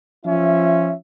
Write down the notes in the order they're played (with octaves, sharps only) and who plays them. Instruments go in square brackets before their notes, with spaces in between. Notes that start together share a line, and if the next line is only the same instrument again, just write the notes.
[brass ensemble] F3 C#4 F4 E5